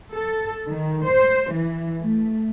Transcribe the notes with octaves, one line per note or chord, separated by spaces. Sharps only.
A4
D#3
C5
E3
A3